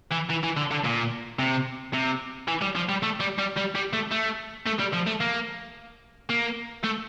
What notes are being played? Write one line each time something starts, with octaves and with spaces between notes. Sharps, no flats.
E3
E3
E3
D3
D3
A#2
C3
C3
E3
G3
F3
G3
A3
G3
G3
G3
G3
A3
A3
A3
G3
F3
A3
A#3
A#3
A3